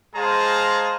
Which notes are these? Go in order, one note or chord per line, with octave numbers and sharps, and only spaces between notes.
G#3 G#4 C5 F5 A5 A#5